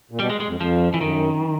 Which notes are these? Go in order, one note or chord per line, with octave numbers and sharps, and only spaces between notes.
A#2
B2 G3
G#3
G#3
F2
F2 F3
E3
F#2 D#3